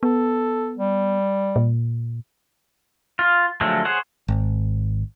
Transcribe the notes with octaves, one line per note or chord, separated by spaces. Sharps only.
B3 A4
G3
A#2
F4
D3 F3 F#3 G#3 A3
G#4 C5 C#5 F#5
G#1